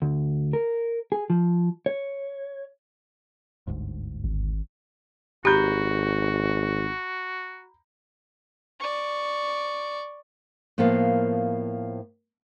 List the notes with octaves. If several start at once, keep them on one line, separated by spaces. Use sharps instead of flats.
D2
A#4
G#4
F3
C#5
G1 D2 G#2
G#1
G#1 F#4 G4 A#5 B5 G6
D5 C#6
A2 F3 A#3 B3 A#4 F5